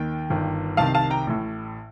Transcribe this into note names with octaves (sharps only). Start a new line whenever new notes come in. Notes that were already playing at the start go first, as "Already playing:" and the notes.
Already playing: D#2 D#3 G5
G1 G2 D#3
C2 C3 D#3 F5 A5
F5 A5
G5 A#5
A1 A2